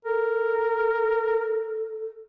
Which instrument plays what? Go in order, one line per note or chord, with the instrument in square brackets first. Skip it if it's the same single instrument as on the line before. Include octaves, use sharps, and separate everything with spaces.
[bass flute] A4 [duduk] A#4